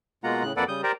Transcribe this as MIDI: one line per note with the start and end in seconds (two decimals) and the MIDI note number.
0.24 0.43 47
0.24 0.43 56
0.24 0.43 58
0.24 0.43 65
0.24 0.43 78
0.24 0.43 82
0.43 0.53 45
0.43 0.53 49
0.43 0.53 90
0.57 0.64 41
0.57 0.64 58
0.57 0.64 69
0.57 0.64 71
0.57 0.64 74
0.57 0.64 78
0.68 0.81 49
0.68 0.81 55
0.68 0.81 87
0.68 0.81 91
0.83 0.92 67
0.83 0.92 70
0.83 0.92 72
0.83 0.92 74
0.83 0.92 82